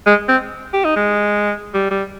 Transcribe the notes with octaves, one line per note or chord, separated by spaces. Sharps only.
G#3
C4
G4
D#4
G#3
G3
G3